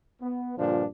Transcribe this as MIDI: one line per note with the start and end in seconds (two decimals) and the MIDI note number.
0.22 0.53 59
0.57 0.85 43
0.57 0.85 46
0.57 0.85 50
0.57 0.85 53
0.57 0.85 62